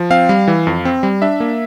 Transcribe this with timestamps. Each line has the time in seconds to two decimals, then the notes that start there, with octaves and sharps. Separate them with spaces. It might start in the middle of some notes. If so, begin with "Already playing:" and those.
Already playing: F3
0.10 C4 F5
0.29 G3
0.48 E3
0.67 F2
0.85 C4
1.03 G3
1.22 D4 E5
1.40 A#3